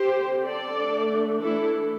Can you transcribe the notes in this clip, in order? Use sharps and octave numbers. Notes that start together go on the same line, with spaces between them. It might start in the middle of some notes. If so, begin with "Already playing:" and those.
Already playing: G4 C5
D3 C4
A4 D5
D3 A3 D4
E3 A3 D4 E4 A4